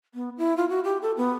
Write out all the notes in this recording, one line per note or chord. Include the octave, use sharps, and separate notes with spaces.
B3
E4
F4
F#4
G4
A4
B3